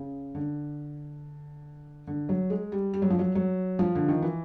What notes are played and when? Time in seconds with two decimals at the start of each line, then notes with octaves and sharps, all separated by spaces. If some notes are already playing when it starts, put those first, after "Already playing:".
Already playing: C#3
0.35 D3
2.07 D3
2.29 F#3
2.50 G#3
2.72 G3
2.94 G3
3.02 F#3
3.10 F3
3.19 F#3
3.35 F#3
3.79 F3
3.95 D3
4.08 D#3
4.22 E3